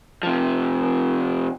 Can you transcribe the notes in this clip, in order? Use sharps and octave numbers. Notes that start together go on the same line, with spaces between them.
C3 F3